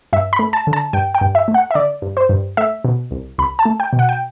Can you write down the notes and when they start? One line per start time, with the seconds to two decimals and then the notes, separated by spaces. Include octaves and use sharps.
0.13 G2 E5
0.33 B5
0.39 A3
0.53 A5
0.67 D3
0.73 A5
0.93 G2 G5
1.15 G5
1.21 G2
1.35 E5
1.48 A3
1.54 F#5
1.71 E5
1.75 D3 D5
2.02 G2
2.17 C5
2.29 G2
2.57 A3 E5
2.84 B2
3.11 C2
3.38 C2 B5
3.59 A5
3.65 A3
3.80 G5
3.93 B2
3.99 F#5
4.09 G5